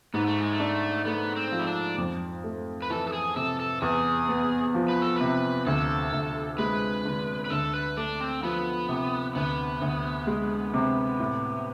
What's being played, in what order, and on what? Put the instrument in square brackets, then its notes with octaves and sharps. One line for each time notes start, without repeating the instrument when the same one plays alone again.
[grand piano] G#2 [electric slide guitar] B3
[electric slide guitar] A3
G#3
A3
[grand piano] D4
[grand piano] A3 [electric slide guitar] B3
[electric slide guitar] C4
[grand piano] F3
[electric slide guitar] E4
D4
[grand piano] F2
A3
[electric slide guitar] B4
[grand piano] E3 [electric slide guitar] A4
[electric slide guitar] A4
G#4
[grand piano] C3 [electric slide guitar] A4
[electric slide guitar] A4
[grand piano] E2 [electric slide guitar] G#4
[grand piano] B3
F3
[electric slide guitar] B4
A4
[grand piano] C3 [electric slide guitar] B4
[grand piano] D2 [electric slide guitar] A4
[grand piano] D2
[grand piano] G#3 [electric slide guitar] B4
[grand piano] D3
[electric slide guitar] B4
[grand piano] D2 [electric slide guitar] A4
[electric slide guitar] B4
[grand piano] A3 [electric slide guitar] D4
[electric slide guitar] C4
[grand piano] F3 [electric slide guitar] B3
[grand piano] C3
[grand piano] D2 [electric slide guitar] B3
[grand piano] D2
G#3
C3
A2